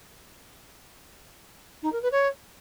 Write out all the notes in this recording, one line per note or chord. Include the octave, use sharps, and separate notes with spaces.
D#4
A#4
B4
C#5